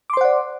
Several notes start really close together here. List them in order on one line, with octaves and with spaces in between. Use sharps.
D6 C6 C5 F#5 D5